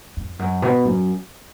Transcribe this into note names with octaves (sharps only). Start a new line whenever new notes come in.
F2
F#2
B2
F#2